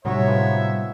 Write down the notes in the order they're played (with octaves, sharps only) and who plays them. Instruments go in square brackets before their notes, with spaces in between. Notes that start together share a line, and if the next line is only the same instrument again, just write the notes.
[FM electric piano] A2 C3 G3 [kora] F#3 C#4 D#4 [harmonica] C#5 E5
[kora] F3 G#3 B3